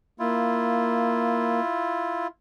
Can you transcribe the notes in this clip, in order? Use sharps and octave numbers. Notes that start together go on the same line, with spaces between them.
A#3 E4 F4